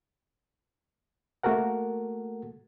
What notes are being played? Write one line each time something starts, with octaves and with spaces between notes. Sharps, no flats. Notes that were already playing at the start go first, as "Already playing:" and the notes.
A3 A#3 F#4 A4 A#4 F#5